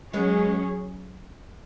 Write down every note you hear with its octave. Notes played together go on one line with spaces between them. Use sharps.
F#3 G#3 B3 C#4 G#4 C#5